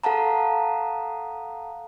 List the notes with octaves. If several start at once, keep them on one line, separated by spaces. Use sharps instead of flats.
A4 F5 F#5 A5 A#5